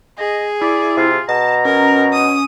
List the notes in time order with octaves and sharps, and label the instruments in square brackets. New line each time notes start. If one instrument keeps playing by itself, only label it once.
[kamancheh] G#4 [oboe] D#5
[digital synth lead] E4 [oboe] D5
[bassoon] C3 [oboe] F4
[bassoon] B2 [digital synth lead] A5 [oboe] A#5
[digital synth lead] C#4 [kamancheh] A#4
[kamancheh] D#6